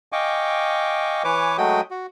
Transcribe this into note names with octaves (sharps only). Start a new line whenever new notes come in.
D#5 F5 G5 G#5 C#6 D6
E3 B4 C#5 G#5 D6
F#3 G#3 A3 F#4 G5 D#6
F#4